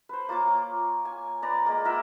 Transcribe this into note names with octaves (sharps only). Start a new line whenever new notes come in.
B4 C5
A#3 F4 C#5 D6
G#5
B4 D5 A#5
G#3 A#3
F4 A#4 E5 F#5